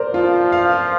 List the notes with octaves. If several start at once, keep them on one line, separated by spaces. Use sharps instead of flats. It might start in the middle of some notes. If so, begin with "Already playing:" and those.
Already playing: A#4 C5 D5
F3 F4
F5